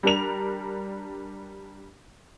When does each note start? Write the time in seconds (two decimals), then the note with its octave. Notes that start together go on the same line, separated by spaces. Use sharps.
0.03 G3 D4 A#4 F7